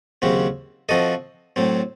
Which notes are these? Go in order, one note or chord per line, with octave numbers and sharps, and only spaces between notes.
D#2 C#3 F#3 C4 F#4
F3 C4 F#4 A4 D#5
A2 F#3 C4